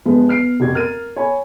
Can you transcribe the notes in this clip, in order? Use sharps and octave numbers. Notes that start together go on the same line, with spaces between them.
G1 F3 G#3 B3 B4
B3 F6 C7 D7
F1 F#4 G4 G#6
A#4 F6 A6 D#7
C#5 G#5 B5